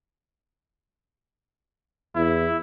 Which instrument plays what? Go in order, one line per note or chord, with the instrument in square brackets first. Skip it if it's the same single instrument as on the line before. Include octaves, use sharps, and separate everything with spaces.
[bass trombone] E2 [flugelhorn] E4